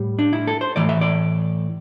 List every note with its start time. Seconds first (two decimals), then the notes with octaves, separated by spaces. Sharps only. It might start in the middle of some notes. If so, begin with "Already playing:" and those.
Already playing: A2 G3
0.19 D4
0.33 E4
0.47 A4
0.61 C5
0.76 A2 E3 A3 D5
0.89 E5
1.01 D5